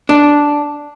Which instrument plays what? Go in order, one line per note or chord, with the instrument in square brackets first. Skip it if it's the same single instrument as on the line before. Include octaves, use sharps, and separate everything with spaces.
[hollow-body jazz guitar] D4